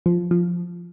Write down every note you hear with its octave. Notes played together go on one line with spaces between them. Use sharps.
F3
F3